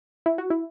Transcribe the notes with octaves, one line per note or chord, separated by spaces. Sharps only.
E4
F#4
E4